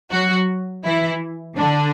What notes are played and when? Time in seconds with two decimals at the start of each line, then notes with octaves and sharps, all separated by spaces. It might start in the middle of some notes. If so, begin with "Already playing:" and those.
0.11 F#3 F#4
0.84 E3 E4
1.57 D3 D4